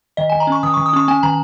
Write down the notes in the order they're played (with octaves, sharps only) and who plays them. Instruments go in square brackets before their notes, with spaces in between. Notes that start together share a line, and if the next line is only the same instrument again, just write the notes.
[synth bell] D#3 D#5
D#3 G#5
A#5
C#4 C#6
D#3 D#6
D#3 C#6
D#6
C#4 C#6
C#4 G#5
D#3 A#5